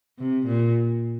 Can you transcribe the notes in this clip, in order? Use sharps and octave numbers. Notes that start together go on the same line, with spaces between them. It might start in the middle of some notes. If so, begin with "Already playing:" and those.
C3
A#2